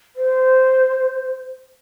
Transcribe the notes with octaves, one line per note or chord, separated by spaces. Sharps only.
C5